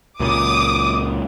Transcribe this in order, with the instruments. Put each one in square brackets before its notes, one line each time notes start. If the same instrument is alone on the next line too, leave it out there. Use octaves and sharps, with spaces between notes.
[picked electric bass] C#2 A#2 [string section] D6 D#6